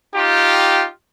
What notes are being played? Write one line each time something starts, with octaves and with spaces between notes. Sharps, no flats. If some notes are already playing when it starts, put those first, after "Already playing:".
D#4 F4 G4